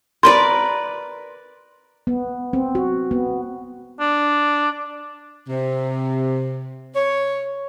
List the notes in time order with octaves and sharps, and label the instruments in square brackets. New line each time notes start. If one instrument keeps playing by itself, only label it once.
[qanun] A#4 B4 D5 [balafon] C6
[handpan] B3
C4
F#4
B3
[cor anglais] D4
[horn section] C3
C#5